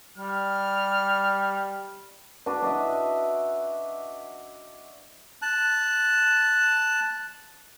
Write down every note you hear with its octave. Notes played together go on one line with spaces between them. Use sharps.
G3 F6
D4 F#4 B4
D4 D#5 E5
A5 F#6